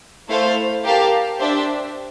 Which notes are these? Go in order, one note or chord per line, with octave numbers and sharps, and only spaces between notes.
A3 E4 A4 C5 F5
G4 A#4 F5 A5
D4 G4 C5 E5